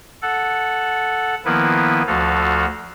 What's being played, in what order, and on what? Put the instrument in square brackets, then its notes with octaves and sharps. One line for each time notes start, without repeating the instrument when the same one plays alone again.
[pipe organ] A4 F#5
D#3 F3 A#3 B3 E4 B4
D2 F3 F#4 A4 F5